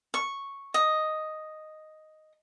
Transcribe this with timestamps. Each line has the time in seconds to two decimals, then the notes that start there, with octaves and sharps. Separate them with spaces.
0.14 C#6
0.74 D#5